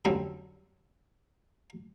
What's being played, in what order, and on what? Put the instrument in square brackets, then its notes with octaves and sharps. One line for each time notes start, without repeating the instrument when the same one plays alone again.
[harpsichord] F2 D3 F#3 G3 C4 C#4